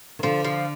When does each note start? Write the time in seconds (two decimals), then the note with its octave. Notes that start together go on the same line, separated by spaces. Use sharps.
0.19 D#3
0.23 D3 F3
0.44 F3